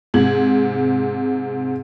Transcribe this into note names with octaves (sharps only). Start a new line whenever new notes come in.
G#2 C3 G#6 F#7